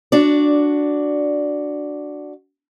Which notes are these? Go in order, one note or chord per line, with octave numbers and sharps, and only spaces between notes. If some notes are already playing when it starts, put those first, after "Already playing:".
D4 F#4 D5